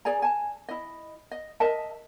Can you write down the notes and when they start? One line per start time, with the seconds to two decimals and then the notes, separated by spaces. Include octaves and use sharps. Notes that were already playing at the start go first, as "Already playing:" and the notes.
0.05 G#4 D5 G#5 A#5
0.22 G#5 A5
0.69 E4 D#5
1.31 D#5
1.60 A#4 D#5 E5 A5